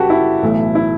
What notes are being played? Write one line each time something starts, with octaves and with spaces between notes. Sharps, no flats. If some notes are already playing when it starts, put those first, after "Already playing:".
Already playing: F#2 C#3 G3 F#4 G4 A4 B4
E4
B1 A2 E3 A3
E4